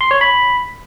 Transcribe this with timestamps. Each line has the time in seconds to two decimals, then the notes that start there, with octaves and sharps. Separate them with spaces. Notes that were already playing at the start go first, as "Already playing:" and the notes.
0.01 C6
0.11 C#5
0.21 B5